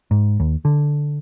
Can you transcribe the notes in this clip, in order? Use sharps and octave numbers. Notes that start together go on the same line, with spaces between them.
G#2
D#2
D3